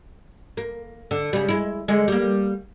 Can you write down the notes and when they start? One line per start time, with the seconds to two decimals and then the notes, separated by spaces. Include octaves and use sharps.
0.57 A#3
1.11 D3
1.33 C#3 G3
1.48 G#3 E4
1.88 D3 G#3
2.08 G3 A#3